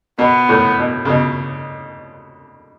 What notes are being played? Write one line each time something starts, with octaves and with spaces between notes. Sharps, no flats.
B2 B3
A2
B2
C#3
B2